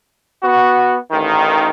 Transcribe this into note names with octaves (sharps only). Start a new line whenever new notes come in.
B3 F#4
A1 D#3